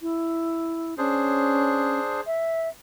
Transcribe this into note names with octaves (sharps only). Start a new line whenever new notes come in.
E4
C#4 D4 G#4 C5
E5